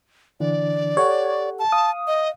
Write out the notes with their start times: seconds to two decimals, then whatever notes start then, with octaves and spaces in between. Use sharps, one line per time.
0.40 D3 E3 D4 D5
0.97 G4 A4 C#5 F#5
1.59 A5
1.72 F5 D#6
2.07 D#5